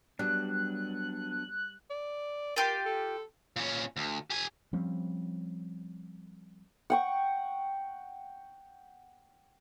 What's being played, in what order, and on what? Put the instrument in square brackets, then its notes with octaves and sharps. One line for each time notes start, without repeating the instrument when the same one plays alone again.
[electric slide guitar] F#3 B3 D4 [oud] G3 [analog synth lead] F#6
[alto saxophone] D5
[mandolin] F4 G4 C6 [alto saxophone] A#4
[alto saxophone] A4
[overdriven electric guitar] A#2 C#4
D2
G4 G#5
[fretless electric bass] F3 G3 C4 C#4
[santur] F#5 G5 C#6